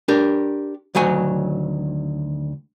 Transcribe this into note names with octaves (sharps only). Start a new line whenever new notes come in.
D4 G4 A#4
D2 D#3 F#3 C#5 G#5